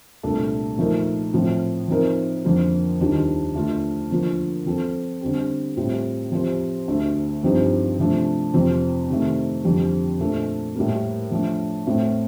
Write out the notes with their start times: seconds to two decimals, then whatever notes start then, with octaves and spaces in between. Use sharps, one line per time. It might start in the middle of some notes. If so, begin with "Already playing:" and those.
0.23 C2 A#2 A3 D4 A4
0.78 A#2 F3 A3 D#4 A#4
1.33 A2 F3 C4
1.88 F3 C4 D#4 A#4
2.44 F2 D3 F3 A#3 F4
3.00 D#2 D#3 G3 D4 F4
3.55 D3 A3 D4 F4
4.11 D3 F3 A#3 F4
4.66 F3 C4 F4 A4
5.21 D3 G3 C4 G4
5.77 A2 G3 C4 F4
6.32 F3 C4 G4 C5
6.88 D2 D3 A3
7.43 G2 F3 C4 D#4 G4
7.99 C3 F3 A3 D4
8.54 F2 C3 F3 C4
9.09 C3 D#3 A3
9.64 F2 D3 G3 C4
10.19 A#2 A3 D4 A4
10.76 A2 G3 A#3
11.31 F3 A3 D4
11.87 A2 A3 C4